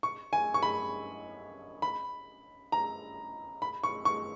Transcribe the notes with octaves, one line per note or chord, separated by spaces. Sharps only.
C#6
G#5
C#6
B5
B5
A#5
B5
C#6
C#6